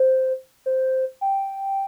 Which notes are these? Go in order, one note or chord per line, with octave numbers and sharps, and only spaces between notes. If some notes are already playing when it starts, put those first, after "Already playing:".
Already playing: C5
C5
G5